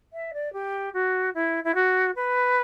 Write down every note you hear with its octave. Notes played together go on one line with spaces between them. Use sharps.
E5
D5
G4
F#4
E4
E4
F#4
B4